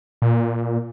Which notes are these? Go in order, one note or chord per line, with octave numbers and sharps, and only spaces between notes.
A#2